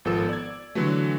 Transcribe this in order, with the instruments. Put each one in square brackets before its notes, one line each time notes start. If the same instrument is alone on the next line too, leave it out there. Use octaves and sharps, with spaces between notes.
[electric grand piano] G#1 F3 B3 A4 E6
D5 G#6
D3 E3 F#3 A3